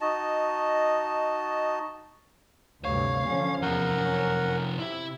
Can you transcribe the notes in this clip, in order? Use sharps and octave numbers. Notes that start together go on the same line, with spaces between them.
D#4 F#4 D#5 A5
D2 G2 C3 C#5 F5
D3 F3 C#4
E2 C3 F3 A#4 F#5
F#2 C#4
C3 E4 E5